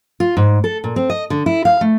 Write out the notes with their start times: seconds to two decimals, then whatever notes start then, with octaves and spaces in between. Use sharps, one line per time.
0.20 F4
0.37 G#2
0.64 A4
0.84 A#2
0.96 C4
1.10 D#5
1.30 D3
1.46 E4
1.65 F5
1.81 A3